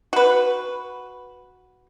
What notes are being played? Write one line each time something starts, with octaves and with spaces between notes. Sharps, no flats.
F#4 B4